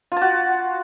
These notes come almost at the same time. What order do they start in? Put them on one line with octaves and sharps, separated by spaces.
F4 A5 F#4